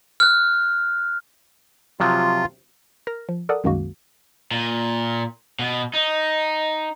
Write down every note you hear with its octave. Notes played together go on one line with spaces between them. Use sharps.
F6 F#6
C3 F3 F#3 F4
A#4 F6 A#6
F3
A4 A#4 D5 F#5 D#6
C2 F#2 D#3 G#3 A#3 F#4
A#2
B2
D#4